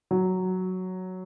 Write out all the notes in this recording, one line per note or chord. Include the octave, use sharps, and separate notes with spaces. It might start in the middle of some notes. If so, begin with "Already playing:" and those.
F#3